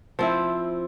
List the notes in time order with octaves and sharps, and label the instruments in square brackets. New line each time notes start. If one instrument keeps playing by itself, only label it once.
[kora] F3 C4 E4